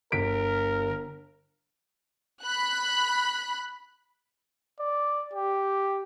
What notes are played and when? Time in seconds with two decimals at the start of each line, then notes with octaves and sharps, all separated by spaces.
0.12 G1 A#4 B6 D7
2.42 B5 F#6
4.80 D5
5.33 G4